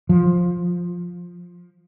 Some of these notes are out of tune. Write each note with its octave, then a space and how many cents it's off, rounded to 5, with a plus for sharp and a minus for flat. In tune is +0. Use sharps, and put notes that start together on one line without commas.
F3 +10